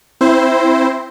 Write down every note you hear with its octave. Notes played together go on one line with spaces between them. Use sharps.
C4 E4 C5